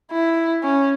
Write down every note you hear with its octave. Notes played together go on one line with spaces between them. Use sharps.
E4
C#4